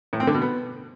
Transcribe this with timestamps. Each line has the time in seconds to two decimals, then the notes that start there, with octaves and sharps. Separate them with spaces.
0.13 A2
0.20 C4
0.27 D3
0.34 B2
0.42 B3